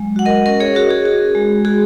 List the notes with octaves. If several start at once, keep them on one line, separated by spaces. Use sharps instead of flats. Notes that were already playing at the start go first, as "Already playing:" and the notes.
Already playing: F#3 G#3
F#4 F#5
A#4 D#5
C#4 A#4 D#5
G#4 C#5
F#4 A#4
G#4
F#4
G#3
F#4 G#4